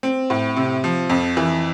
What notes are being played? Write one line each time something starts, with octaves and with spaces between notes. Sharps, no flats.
C4
A2
C3
F3
F2
E3